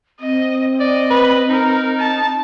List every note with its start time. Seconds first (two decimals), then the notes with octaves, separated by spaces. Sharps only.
0.20 C4 D#5
0.80 D5 D#5
1.10 B4
1.50 D#4 A#4
1.99 A5